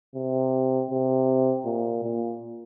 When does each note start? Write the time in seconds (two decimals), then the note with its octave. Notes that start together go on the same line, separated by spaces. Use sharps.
0.15 C3
0.91 C3
1.65 A#2
2.03 A#2